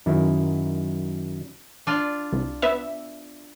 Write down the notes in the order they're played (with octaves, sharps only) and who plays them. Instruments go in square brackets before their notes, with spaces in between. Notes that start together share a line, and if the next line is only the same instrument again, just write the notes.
[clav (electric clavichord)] F#2 D#3 E4
[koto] D4 F4
[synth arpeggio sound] C2
B3 E5